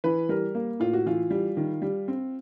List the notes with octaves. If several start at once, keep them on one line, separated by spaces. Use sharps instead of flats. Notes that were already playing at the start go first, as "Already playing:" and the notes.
E3 B4
G3 A#4
A#3
A2 F4
F#4
E3 F4
G3
D#3
G3
C4